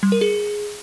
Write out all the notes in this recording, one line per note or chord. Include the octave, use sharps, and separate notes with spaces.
G3
A#4
G#4